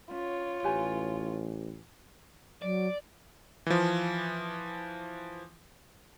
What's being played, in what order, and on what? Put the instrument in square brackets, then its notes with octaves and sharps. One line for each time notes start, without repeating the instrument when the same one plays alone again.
[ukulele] C#4 [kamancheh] F4 C#5
[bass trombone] A1 [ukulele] G4 B4 G#5
[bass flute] F#3 [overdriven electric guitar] D5
[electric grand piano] E3 F3